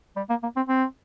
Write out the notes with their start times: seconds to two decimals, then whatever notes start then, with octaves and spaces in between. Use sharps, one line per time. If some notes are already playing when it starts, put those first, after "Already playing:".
0.17 G3
0.30 A#3
0.43 A#3
0.56 C4
0.69 C4